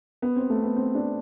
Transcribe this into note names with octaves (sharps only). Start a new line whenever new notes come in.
B3
C4
A3
B3
C4
D4